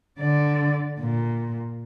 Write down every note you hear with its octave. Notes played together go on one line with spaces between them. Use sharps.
D3 D5
A#2